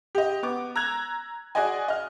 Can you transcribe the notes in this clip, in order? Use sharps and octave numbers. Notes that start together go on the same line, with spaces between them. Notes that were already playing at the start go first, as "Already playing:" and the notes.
G4 D#5
B3 D6
A#5 E6 F#6 G#6 F7
F#4 G#4 D5 D#5 G#5
D#5 F6